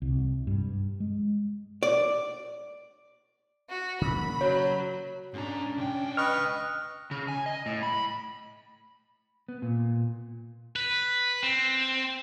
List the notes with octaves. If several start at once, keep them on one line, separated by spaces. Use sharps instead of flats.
C2
G2
G#3
D5
F#4
C#3 A#3 B5
F#3 C#5
G#2 C#4 D4 A#5
C#2 G5
B4 D#5 C#6 F6
C#3
G#5
D#5
A2
B5
B3
A#2
B4
C4